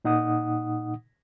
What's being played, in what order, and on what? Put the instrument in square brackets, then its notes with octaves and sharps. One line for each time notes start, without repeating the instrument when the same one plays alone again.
[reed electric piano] A#2 D#4 F#5 D#6